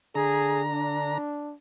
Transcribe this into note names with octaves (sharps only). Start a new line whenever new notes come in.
D3 G#4 A#5
D4